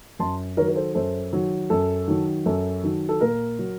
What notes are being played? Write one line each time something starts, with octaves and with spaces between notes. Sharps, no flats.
F#2 A5 C6
D#3 F#3 A#4 C#5
A#4
A4 C5
F#2 A4 C5
D#3 F#3
F#2 A4
D#3 F#3
F#2 A4
D#3 F#3
A4
A#2 A#4
F#3